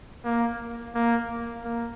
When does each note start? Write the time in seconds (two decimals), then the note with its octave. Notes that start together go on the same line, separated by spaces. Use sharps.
0.24 A#3
0.95 A#3
1.64 A#3